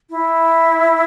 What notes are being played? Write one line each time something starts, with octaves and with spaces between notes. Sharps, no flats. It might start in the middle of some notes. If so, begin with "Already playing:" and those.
E4